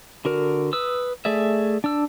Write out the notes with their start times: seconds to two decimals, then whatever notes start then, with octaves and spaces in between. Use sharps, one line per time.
0.25 D3 F#4 A#4
0.73 B4 D#6 E6
1.25 A3 G#4 D5 E5
1.84 D4 E6